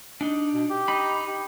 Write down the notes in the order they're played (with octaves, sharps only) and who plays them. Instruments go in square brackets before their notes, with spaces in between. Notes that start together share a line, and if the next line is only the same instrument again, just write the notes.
[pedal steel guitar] D4 D#4
[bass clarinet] B2
G4
[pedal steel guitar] D#4 B5
[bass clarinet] G4